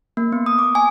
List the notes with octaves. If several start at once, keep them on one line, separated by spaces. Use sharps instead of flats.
A#3
B3
D#6
D6
G#5